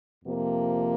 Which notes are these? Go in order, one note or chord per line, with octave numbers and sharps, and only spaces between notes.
F2 C3 F3 A#3